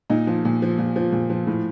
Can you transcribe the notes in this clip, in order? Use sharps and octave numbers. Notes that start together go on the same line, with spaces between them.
A#2 D#4
F3
A#2
F3
A#2
F3
A#2
F3
A2